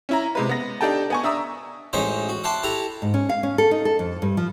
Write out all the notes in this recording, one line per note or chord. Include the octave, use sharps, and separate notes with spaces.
C#4 E4 A#5
C3 G#3 B4
B3 A#6
D4 D#4 G4 A4 G5 A5
B3 G#5 C#6
D4 E5 A#5 D#6 E6
A1 G#3 C#4 D#4 C5 E5
F#4
E5 F#5 G5 A5 C6 D6
E4 G4 A4 A#5
G#2
C#4
F5
C#4
A4
D#4
A4
F2
G2
F3